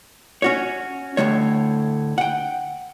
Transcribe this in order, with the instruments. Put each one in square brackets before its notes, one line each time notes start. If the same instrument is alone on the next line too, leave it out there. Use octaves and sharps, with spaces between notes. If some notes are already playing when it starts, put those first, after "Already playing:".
[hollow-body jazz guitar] C#4 F#4 C#5
D2 A2 F3 C#5
F#5 G5